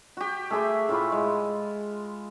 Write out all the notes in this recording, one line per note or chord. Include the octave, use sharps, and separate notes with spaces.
F#4 G4
A3 G#4 E5 C6
A2 F4 G4 B5
G#3